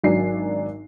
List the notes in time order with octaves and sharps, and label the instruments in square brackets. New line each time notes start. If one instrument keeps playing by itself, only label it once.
[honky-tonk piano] G#1 F#3 D4 G#5 C7